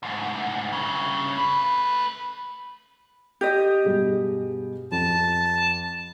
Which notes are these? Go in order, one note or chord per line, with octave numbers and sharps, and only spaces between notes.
D2 G#2
G2 C#3
A3 B4
G4 D#5
G2 B2 G#4
F2 A5